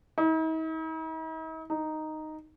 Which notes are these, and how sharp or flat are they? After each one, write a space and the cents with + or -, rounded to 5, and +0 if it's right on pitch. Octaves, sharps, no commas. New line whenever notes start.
D#4 +45
D#4 -5